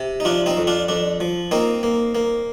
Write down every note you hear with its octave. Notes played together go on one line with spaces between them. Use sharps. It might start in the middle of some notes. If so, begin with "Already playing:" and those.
Already playing: C3
D#4
F3 D4 F4
C4 D#4
F2
D4 F4
F2 D4
F3
A#3 C4 D#4
A#3
A#3